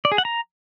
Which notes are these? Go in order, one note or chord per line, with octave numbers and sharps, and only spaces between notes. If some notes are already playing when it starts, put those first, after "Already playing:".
D5
G#4
F#5
A#5